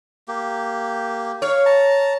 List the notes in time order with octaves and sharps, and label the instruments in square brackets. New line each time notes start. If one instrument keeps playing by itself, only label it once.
[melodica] A#3 G4
[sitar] C#5 [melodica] F5
[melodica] A5 A#5